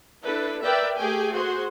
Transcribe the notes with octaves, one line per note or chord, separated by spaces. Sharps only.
D4 E4 A4 B4
A#4 B4 D5 E5 G5
A3 G4 G#4 G5 G#5
F#4 G#4 C5 C6